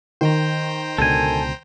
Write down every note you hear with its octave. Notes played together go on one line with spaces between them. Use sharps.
D#3 C5 G5 A#5
C#2 B2 D3 A4 G#5